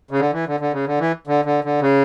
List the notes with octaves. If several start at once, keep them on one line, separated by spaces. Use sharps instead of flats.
C#3
D3
E3
D3
D3
C#3
D3
E3
D3
D3
D3
C#3